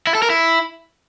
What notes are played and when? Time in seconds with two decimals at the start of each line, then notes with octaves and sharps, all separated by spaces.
0.07 E4
0.15 A4
0.22 A#4
0.30 E4